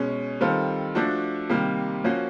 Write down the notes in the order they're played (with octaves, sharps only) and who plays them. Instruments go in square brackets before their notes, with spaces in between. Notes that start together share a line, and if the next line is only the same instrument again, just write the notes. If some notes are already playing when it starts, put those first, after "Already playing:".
Already playing: [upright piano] B2 G#3 C#4
D#3 G3 C4 F4 A4
F3 A3 D4 F#4 A4
C3 D#3 G3 A#3
F3 A#3 C#4 F#4